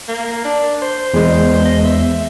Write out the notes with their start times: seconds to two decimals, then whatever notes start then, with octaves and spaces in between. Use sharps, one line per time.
0.09 A#3
0.45 D4
0.82 C5
1.14 E2 G#3
1.65 D#5
1.85 E5